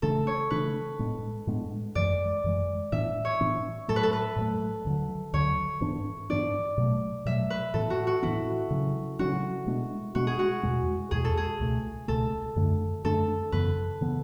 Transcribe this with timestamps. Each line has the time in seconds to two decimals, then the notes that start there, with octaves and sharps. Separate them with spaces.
0.02 C#3 E3 A3 D4 A4
0.27 C#5
0.50 C#3 E3 A3 D4 B4
0.99 A2 G#3 B3 D4
1.47 A2 G#3 B3 D4
1.95 F#2 E3 G#3 D5
2.44 F#2 E3 G#3
2.92 A2 E3 B3 D4 E5
3.25 C#5
3.41 A2 E3 B3 D4
3.88 A2 F#3 A3 A4
3.96 B4
4.03 A4
4.13 B4
4.36 A2 F#3 A3
4.85 D2 D3 F#3
5.33 D2 D3 F#3 C#5
5.81 G#2 E3 B3 D4
6.30 G#2 E3 B3 D4 D5
6.77 B2 F#3 A3
7.25 B2 F#3 A3 E5
7.50 B4
7.74 A2 E3 B3 A4
7.90 F#4
8.07 F#4
8.22 A2 E3 B3 E4
8.70 C#3 F#3 C#4
9.19 C#3 F#3 C#4 F#4
9.67 B2 G#3 B3 D4
10.15 B2 G#3 B3 D4 F#4
10.27 G#4
10.39 F#4
10.63 E2 B2 G#3
11.11 E2 B2 G#3 G#4
11.25 A4
11.37 G#4
11.60 C#2 B2 A3
12.08 C#2 B2 A3 A4
12.56 F#2 D3 A3 D4
13.04 F#2 D3 A3 D4 A4
13.52 F#2 C#3 E3 B3 B4
14.01 C#3 E3 B3